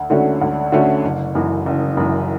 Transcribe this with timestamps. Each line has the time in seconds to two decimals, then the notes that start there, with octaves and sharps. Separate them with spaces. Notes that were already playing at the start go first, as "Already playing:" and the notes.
Already playing: D2
0.10 D3 A3 C#4 F#4
0.41 D2
0.72 D3 A3 C#4 F#4
1.04 F#1
1.35 F#2 E3
1.66 F#1
1.97 F#2 E3